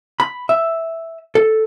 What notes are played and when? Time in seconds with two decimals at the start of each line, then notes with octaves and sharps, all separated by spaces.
0.20 B5
0.49 E5
1.35 A4